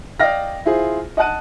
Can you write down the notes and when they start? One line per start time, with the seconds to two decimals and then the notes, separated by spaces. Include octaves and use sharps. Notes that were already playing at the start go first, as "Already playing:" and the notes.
0.20 D5 D#5 F5 G5 F6 A#6
0.66 E4 F4 G#4 C5
1.17 D#5 F#5 A5 F#6 D#7